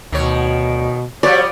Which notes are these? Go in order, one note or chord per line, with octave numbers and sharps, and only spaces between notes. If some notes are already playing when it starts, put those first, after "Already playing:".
D2 B2 D#3 C#5
F3 G3 B3 F#4 C#5 D5